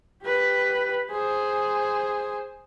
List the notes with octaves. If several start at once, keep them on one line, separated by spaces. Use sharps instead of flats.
G4 B4
G#4 C5